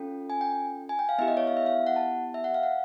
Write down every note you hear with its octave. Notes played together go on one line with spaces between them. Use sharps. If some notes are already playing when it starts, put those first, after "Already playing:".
Already playing: C#4 F4 A4 G5
G#5
G5
G#5
G5
F5
B3 E4 G4 E5
D#5
C#5
F5
E5
F5
F#5
A5
E5
F#5
F5
F#5